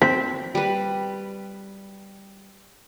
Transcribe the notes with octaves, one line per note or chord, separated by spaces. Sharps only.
C4 B6
G3 B4